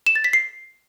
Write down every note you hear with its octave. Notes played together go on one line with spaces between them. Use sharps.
E7
A6
B6
C7